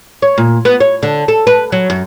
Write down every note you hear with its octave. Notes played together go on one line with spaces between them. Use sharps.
C#5
A#2
B3
C#5
D3
A4
B4
F#3
F#2